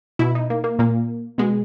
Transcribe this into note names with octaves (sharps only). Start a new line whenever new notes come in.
B2 E4
D#4
A#3
A#3
A#2 A#3
B2 G#3